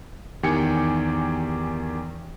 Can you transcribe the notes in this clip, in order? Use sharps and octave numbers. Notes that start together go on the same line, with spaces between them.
E2 D#3 G4 G5 G#5 C#7